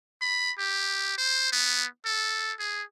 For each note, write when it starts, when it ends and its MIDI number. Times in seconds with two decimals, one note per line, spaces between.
0.21 0.51 83
0.58 1.14 67
1.18 1.48 72
1.52 1.86 59
2.05 2.53 69
2.59 2.83 68